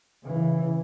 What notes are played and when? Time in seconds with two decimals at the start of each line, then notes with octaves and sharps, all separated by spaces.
0.24 C#3 E3